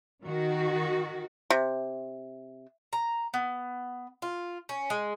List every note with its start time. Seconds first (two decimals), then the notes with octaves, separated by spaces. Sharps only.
0.24 D#3 F#4
1.50 C3
2.93 A#5
3.34 B3
4.22 F4
4.69 C#4
4.90 G#3